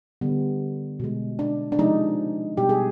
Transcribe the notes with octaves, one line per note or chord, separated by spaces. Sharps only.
D3 G3 B3
B2 G#3
D4
D4
C3 F3 G#3 D#4
B2 G3 G4
G#4